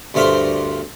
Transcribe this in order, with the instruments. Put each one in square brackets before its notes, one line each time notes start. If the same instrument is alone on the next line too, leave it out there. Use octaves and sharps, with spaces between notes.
[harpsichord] D2 G2 A3 A#4 C5 C6